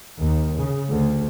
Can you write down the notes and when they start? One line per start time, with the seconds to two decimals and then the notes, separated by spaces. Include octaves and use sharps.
0.18 D#2
0.57 C#3
0.89 D2